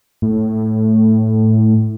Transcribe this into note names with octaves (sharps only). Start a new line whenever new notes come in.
A2